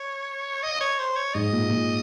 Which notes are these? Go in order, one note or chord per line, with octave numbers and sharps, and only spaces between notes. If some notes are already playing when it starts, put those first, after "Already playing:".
Already playing: C#5
D#5
C#5
C5
C#5
G#2 D#5
A#2
A#2